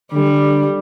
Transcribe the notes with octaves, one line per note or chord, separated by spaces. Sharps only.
D3 G3